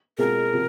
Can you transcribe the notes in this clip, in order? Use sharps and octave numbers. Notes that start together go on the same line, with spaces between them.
B2 G#3 C4 F4 G#4 A#4
C3 F3